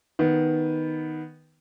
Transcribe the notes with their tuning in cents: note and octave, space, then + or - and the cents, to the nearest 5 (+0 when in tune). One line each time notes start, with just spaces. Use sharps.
D#3 +5 B3 +0